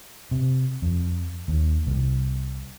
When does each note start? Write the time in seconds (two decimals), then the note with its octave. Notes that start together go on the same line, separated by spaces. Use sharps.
0.31 C3
0.82 F2
1.48 D#2
1.87 C2